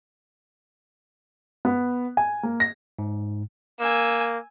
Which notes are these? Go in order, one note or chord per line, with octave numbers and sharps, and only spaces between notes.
B3
G#5
A#3
A#6
G#2
A#3 G#5 E6